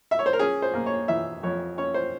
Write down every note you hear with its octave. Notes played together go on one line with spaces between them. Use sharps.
E5
C#5
C5
A#4
C#4 G#4
C5
A#3
C#5
E3 E5
F2 C#5
C#4 C#5
C5